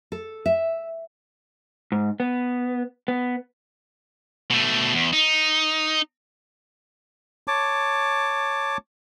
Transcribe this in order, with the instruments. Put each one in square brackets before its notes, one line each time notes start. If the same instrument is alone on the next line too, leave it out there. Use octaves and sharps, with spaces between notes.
[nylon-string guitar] A4
E5
[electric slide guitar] G#2
B3
B3
[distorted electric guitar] B2 A3
E2
D#4
[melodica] C#5 A5 D6